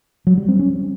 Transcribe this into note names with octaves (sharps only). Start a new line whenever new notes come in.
F#3
G3
C4
C#4